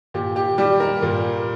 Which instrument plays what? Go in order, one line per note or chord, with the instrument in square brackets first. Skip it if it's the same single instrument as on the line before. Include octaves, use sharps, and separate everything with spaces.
[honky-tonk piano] A#2 G4
G4
G3 G4
A#4
A#2